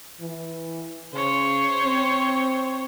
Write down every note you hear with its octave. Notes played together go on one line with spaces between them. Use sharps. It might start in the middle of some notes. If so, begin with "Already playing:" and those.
E3
C#3 C5 C#5
C4